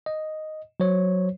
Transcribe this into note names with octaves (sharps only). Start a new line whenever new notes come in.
D#5
F#3 C5 C#5